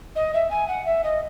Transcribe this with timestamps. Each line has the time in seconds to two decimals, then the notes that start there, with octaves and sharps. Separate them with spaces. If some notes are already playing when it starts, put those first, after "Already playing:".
0.16 D#5
0.34 E5
0.51 G#5
0.68 F#5
0.86 E5
1.04 D#5